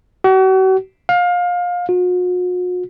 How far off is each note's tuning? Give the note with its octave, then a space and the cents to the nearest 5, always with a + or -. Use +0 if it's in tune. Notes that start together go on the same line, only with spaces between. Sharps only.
F#4 +40
F5 +25
F#4 -45